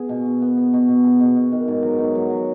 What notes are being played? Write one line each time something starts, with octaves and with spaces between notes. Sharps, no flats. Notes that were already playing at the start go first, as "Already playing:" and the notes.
Already playing: B3 G#4
B2
G#4
B3
B3
B2
B2
G#4
B2
B2
D#3
G#2
F#3
D#4
F#3
F#3